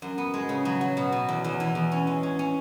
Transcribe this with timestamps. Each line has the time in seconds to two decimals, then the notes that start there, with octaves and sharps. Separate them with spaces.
0.02 F#2
0.18 B3
0.34 G#3
0.49 C#3
0.65 F#3
0.81 F#3
0.97 B2
1.12 B2
1.29 E2
1.44 E2
1.60 E3
1.75 E2
1.92 C#4
2.07 G#3
2.23 C#4
2.39 C#4